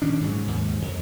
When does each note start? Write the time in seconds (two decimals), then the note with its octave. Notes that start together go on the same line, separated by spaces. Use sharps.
0.02 A#1 D#3 C#4 D4
0.20 G#2 C#3 F#3
0.47 D#2 G#2
0.82 F2